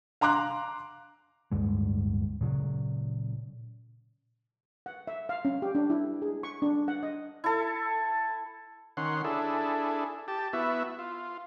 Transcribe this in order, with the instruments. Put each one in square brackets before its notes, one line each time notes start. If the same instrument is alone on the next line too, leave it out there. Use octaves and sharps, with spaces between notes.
[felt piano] F5 A#5 C6 D6 F#6
[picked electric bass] D1 D2 G2 G#3
A#2 C#3 E3 F#3
[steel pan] F#5
E5
F5
C#4
G4
D4
E4
G#4
C#6
D4
F#5
D#5
[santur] E4 A4
[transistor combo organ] D#3 C#4 F#5 C6
D4 E4 G#4 A4
G4 A5
B3 E4 F#4 E5
F4